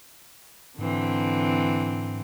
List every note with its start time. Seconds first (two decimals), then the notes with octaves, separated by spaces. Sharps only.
0.78 G#2 D3 E3 C4